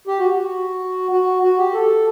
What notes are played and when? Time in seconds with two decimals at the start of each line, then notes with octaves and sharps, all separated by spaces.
0.07 G4
0.19 F#4
0.34 F#4
1.12 F#4
1.43 F#4
1.58 G4
1.74 A4